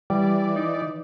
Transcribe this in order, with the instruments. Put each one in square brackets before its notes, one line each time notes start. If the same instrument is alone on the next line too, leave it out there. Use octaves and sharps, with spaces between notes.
[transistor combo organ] E3 D5 [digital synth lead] G3
[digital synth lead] D#4